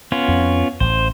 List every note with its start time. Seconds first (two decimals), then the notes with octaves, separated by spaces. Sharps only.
0.12 B3 C#4 F4
0.28 F2
0.80 A1 C5